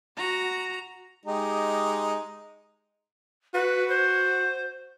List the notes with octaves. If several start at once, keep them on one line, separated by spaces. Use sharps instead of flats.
F#4 A#5
G#3 D#4 G4
F#4 B4
C5